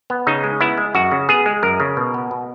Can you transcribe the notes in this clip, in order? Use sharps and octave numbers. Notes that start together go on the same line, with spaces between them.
B3
C#3 D#4
G#3
B3 E4
G#3
F#2 F#4
C#3
B3 G#4
G#3
F#2 A#4
C#3
B2
B3
B2